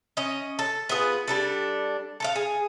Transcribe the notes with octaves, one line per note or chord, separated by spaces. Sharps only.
C#4 D#5
A4
B3 F4 G#4 B4
G3 D4 A4
A4 A#4 F5
G#4